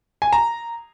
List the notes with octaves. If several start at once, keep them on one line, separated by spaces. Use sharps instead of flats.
G#5
A#5